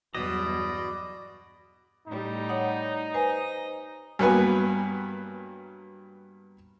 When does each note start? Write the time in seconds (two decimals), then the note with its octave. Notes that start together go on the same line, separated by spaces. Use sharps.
0.15 E2 G2 B2 F#3 D5 D#5
2.07 A2 G3 D#4
2.49 C#5 F#5 D#6
3.14 B4 C5 D#5 G#5
4.19 G2 F#3 A#3 B3 B4 G#5